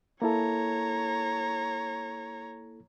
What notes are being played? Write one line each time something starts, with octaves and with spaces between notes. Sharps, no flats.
A#3 E4 A4 C#5 A#5